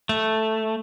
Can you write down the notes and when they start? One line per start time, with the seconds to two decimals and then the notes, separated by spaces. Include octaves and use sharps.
0.09 A3